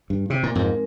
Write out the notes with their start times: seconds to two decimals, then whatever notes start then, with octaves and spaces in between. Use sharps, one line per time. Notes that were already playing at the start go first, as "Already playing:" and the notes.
0.10 G2
0.30 C3
0.43 A#2
0.55 F2 G#2 G#3 C4 D#4 A#4